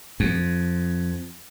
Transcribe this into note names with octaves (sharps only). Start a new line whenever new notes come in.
F2